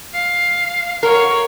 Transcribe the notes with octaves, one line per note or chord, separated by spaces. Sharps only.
F5
F#4 A#4 C#5